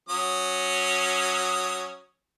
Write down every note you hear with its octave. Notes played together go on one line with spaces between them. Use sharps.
F#3 C#4 D#6